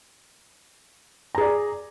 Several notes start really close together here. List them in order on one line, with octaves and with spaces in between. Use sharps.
A#5 G#4 D5